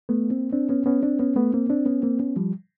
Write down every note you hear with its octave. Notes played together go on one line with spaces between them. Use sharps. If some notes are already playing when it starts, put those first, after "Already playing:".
A3 B3
A#3 C4
C4 D4
B3 C#4
B3 C#4
C4 D4
B3 C#4
A3 B3
A#3 C4
C4 D4
B3 C#4
A#3 C4
B3 C#4
F3 G3